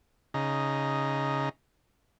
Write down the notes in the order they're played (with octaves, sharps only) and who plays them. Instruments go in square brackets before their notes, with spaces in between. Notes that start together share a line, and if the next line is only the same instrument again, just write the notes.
[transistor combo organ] C#3 D#4